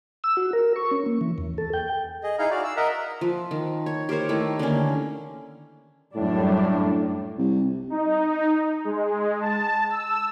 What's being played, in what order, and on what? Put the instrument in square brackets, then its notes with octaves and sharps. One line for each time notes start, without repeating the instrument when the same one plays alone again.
[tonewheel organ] E6
F#4
A#4
C#6
C#4
A#3
E3
E2
A4
G5
[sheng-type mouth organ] G#4 D#5
D#4 E4 G#4 F5 A#5
F#4 D5 F5
E6
A#4 D#5 E5 F#5 A#5
[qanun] F3
D#3
C#5
G4 A#4 C5 C#5
D#3 A3 E4
D3 D#3 A#3 C#4
[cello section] F#2 G3 D4 [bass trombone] A2
[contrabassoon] C2
[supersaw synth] D#4
G#3
A5
E6